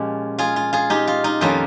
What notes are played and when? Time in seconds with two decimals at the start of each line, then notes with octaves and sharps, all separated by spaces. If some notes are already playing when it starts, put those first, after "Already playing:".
Already playing: A#2 F3 G#3 C#4 G4
0.38 F4 G#4
0.56 F4
0.73 F4 G#4
0.90 D#4 G4
1.07 F4
1.24 D#4
1.41 F2 D#3 G3 A#3 C#4 F4